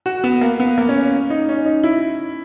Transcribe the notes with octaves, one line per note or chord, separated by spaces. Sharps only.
F#4
B3
A#3
B3
A#3
C#4
D#4
C#4
D#4
E4